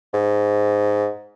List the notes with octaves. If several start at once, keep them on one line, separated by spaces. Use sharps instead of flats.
G#2